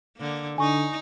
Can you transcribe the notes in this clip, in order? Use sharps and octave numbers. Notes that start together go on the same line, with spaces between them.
D3 A#3
D3 D#4 G#5 C#6